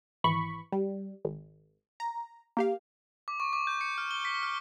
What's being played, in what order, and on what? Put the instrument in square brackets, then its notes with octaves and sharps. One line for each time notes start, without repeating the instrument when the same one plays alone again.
[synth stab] G#1 E3 B5 C#6
G3
G#1
A#5
A#3 G4 F5
[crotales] D6
C#6
D6
G6
C#7
F6
G7
B6
F6